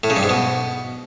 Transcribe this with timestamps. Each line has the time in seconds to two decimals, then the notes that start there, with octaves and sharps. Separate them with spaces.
0.04 A2
0.10 C#3
0.16 G2
0.23 G#2
0.29 B2